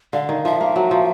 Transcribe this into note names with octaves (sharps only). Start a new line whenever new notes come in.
D3 F5
D#3
F3 E5
A#3
F#3
F3